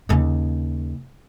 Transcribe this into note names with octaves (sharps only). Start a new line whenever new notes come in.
D#2 C#3